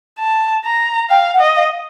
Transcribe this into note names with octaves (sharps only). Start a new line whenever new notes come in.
A5
A#5
F5 G5
F#5
D#5
F5